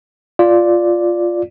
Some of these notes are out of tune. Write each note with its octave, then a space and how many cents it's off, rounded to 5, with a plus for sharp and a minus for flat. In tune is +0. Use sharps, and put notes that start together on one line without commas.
F4 +0 D5 +0